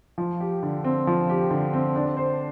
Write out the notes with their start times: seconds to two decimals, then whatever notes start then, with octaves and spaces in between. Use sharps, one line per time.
0.18 F3
0.40 G4
0.63 D3
0.84 C4
1.07 F3
1.29 G4
1.51 D3
1.73 C4
1.95 D4
2.17 C5